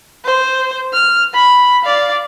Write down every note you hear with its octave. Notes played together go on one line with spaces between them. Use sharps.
C5
F6
B5
D5 F5